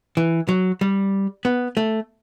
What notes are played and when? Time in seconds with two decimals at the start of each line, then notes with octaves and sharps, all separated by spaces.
0.17 E3
0.49 F#3
0.81 G3
1.45 B3
1.77 A3